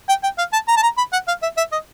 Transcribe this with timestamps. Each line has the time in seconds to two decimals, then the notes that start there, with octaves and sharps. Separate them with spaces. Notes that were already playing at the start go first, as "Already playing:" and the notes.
0.08 G5
0.23 G5
0.38 F5
0.53 A5
0.68 A#5
0.76 A5
0.83 A#5
0.97 B5
1.12 F#5
1.28 F5
1.42 E5
1.57 E5
1.72 D#5